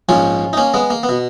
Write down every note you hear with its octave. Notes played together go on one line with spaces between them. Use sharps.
A#1 G#2 F3 C#4 F4
D#4
A#3 C#4
G#3 B3
A#3
B3
B2